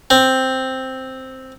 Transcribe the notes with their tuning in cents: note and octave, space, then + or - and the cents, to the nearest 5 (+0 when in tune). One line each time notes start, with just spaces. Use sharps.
C4 +0